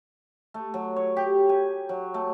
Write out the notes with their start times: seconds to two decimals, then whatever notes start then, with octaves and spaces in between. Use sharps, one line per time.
0.54 A3
0.74 F#3
0.96 C#5
1.17 G4
1.49 G#5
1.89 F#3
2.14 A3